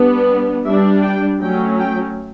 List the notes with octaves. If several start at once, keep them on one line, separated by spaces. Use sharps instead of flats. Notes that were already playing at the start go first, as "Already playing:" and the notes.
Already playing: G3 B3 D4
G3 D4 E5
G5
F#3 A3 C#4 G5
G5